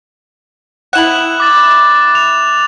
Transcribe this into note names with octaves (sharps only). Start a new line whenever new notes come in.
B3 E4 F#5 F#6 E7 F#7
D6 A6 E7
F7